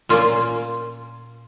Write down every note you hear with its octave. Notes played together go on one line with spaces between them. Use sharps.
A#2 A#3 C#4 F4